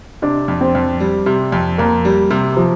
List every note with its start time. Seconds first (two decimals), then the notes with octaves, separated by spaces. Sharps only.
0.22 C3 D4
0.48 F2
0.61 C4
0.75 F2
1.00 G3
1.26 C3
1.52 F2
1.78 F2 A#3
2.05 G3
2.31 C3
2.57 F3